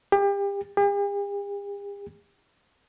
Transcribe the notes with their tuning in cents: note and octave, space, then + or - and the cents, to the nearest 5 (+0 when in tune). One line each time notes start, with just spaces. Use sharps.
G4 +30
G4 +45